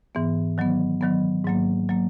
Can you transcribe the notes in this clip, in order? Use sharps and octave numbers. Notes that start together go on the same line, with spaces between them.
G#2 E3 B3
D#3 F#3 B3
D#3 F#3 B3
G#2 F#3 A#3
F#3 A#3